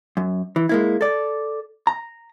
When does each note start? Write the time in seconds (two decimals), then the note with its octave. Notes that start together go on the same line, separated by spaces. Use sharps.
0.17 F#2
0.56 E3
0.69 G#3 A#3 E4
1.01 A4 D5
1.87 A#5